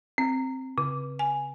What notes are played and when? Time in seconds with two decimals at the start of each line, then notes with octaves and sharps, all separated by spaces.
0.18 C4
0.78 C#3
1.19 G#5